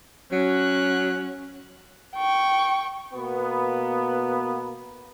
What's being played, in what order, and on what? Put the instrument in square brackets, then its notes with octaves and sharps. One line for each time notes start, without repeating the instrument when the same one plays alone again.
[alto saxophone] F#3 [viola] C#4 F#4 [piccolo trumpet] F#6
[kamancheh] G5 C#6
[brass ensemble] B2 A#3 B3